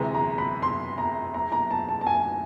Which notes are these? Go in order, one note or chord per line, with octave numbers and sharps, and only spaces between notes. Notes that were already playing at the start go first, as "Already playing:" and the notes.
Already playing: D2 C3 E3 G#3 A#5
A#5
B5
C6
A#5
A#5
A#5
A5
A5
A5
G#5